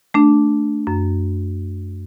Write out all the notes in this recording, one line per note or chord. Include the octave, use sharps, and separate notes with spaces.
A3 D4
F#2